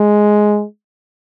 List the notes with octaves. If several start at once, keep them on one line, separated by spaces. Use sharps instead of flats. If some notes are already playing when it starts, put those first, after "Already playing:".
Already playing: G#3